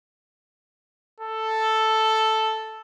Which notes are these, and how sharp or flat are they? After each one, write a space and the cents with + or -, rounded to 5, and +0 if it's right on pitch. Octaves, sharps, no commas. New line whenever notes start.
A4 +0